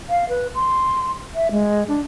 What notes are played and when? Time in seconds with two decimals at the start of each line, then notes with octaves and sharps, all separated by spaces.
0.09 F5
0.29 B4
0.55 C6
1.35 E5
1.51 G#3
1.88 D4